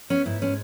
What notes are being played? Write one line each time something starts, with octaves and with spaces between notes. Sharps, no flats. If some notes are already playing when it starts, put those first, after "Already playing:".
B3 C#4
G#2 E4
G#3 C#4